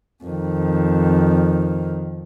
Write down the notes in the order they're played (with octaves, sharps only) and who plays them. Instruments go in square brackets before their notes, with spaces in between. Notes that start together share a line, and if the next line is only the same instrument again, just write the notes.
[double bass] F2 D#3